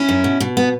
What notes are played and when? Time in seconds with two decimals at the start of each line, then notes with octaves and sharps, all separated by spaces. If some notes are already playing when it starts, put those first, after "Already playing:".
Already playing: C#4 E4
0.09 F#2
0.24 B2
0.40 B2
0.57 B3